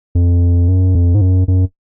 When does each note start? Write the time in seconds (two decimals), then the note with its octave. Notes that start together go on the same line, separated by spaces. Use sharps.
0.15 F2
0.68 F#2
0.95 F2
1.15 G#2
1.21 F#2
1.48 F#2